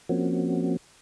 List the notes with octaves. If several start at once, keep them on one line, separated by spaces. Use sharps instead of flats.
F3 A#3 C4 C#4 F#4